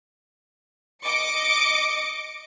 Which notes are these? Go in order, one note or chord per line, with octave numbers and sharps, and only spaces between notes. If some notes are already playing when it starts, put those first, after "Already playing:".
D#5 D6 C#7